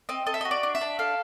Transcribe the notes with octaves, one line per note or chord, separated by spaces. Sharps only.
C4 D#5
A4 D#5
E5
D#5
F#4
D5
D4
E5
D4
A4 F5